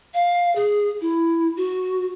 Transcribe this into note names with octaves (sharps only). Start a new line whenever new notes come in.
F5
G#4
E4
F#4